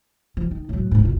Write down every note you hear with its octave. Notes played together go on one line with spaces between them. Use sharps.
F3
D#3
A2 F#3
A#1 G#2
F#1 C#2